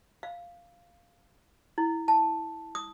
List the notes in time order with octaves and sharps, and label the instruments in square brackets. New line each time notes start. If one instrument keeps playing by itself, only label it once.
[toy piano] F5
E4
A5
D#6